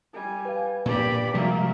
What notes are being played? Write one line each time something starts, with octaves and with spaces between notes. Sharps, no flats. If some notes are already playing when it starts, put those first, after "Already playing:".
G3 G#5
B4 F5
G2 A#2 G4 D5 B5
C3 F3 G3 G#3 A#3 F#4 E5